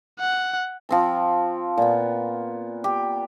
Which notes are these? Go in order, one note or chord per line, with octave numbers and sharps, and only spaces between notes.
F#5
F3 C4 A5
A#2 B3
G4